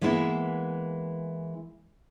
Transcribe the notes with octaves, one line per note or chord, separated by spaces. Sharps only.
E3 G#3 A#3 B3 E4